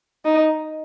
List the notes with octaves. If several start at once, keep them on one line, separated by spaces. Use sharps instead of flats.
D#4